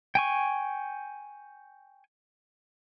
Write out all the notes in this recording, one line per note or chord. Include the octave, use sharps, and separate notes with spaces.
G5 G#5 C#6